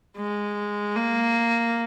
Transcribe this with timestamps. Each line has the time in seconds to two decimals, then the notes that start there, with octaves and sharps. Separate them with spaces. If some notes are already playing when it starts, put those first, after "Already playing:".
0.16 G#3
0.96 A#3